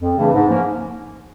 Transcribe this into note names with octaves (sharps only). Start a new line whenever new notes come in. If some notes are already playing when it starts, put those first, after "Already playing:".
F2
C#3 E3 A3 D4
G#2
F3 A#3 C#4